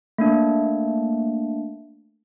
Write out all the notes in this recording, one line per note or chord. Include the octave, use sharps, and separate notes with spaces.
A3 A#3 D4